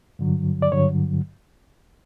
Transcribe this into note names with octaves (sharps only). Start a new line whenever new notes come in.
G2 D3 F#3
D5
G2 D3 F#3 C#5